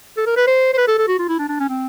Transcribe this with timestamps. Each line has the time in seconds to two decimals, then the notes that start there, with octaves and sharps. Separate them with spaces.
0.17 A4
0.26 A#4
0.37 B4
0.47 C5
0.74 C5
0.78 B4
0.88 A4
0.98 A4
1.08 F#4
1.19 F4
1.29 E4
1.39 D4
1.49 D4
1.60 C#4
1.69 C4